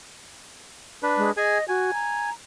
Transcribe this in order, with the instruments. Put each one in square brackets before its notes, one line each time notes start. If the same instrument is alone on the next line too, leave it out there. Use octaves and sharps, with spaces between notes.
[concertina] D4 B4
[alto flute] G#3
[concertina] G#4 G#5 [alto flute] D#5
[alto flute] F#4 [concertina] G#5
[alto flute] A#5